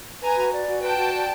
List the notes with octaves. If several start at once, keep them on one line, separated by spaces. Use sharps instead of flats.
B4 G#5 A#5
F#4
D5
F#4
B4 G5 A5
F#4
D5